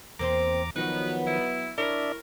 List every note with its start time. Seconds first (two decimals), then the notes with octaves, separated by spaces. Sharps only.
0.19 E2 A#3 C4 C5 A#5 D6
0.76 D#3 F3 F#3 B3 D#4 F#4 B4
1.27 E4
1.78 D4 E4 A#4 C#5 D5 E5